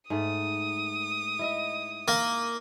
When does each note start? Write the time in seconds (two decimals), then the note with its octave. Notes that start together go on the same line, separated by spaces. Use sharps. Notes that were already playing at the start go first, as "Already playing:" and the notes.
0.10 G#2 A3 D#6
1.39 E4 D#5 E5
2.08 A#3